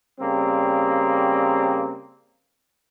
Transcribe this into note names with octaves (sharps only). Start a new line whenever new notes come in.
C#3 G3 A#3 C4